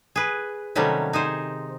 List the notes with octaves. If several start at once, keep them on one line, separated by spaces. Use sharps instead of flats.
G#4 B4
C3 D#3 F#3 G3 A3 C#4
D#4 G#4 C5